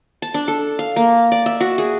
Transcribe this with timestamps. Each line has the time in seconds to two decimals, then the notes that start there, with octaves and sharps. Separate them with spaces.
0.22 A5
0.34 D4
0.48 A4
0.79 F5
0.96 A#3
1.32 D5
1.46 E5
1.61 F#4
1.78 G#4